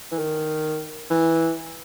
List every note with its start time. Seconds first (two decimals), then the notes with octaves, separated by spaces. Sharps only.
0.12 E3
0.19 D#3
1.10 E3